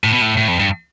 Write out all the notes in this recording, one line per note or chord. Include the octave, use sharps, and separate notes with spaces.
A2
B2
A2
A2
F2
G2